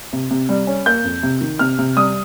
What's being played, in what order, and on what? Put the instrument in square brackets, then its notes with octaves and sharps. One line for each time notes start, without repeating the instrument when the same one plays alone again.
[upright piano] C3
C3
G3
C#4
A#3 G6
F2
C3
D#3
C3 F6
C3
G3 D#6